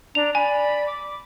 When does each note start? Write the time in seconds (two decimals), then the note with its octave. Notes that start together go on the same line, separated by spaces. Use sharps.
0.15 D4 A#5 F7
0.35 D5 G#5 B5
0.86 D6